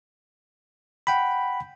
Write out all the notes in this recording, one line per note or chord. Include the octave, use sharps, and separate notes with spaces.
F#5 G5 B5